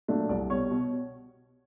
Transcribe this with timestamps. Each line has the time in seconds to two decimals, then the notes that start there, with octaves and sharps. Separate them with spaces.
0.08 A#2 F#3 A3 D4
0.29 C2 D5
0.50 B2 G3 C#5
0.71 B2